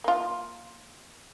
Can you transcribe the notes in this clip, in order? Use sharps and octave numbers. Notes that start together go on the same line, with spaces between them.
A#3 F4